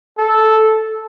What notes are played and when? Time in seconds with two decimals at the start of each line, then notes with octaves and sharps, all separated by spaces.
0.18 A4